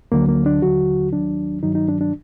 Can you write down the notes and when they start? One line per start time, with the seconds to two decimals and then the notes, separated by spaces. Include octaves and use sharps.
0.12 D2 D3 F#3 A#3
0.28 A#3
0.46 D4
0.62 D#2 D3 F#3 F#4
1.12 D#2 D#3 F#3 D4
1.63 G2 D#3 F#3 D#4
1.75 D#4
1.89 D4
2.01 D4